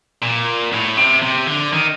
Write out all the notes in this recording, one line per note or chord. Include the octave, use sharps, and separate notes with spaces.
A#2
A2
C3
C3
D3
D#3